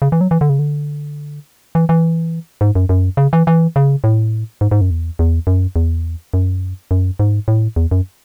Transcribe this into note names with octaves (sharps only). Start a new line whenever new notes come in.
C#3
E3
F#3
E3
D3
C#3
D3
E3
E3
G#2
F#2
F#2
C#3
E3
E3
C#3
A2
G#2
G#2
F#2
E2
E2
F#2
E2
F#2
F#2
G#2
A2
E2
F#2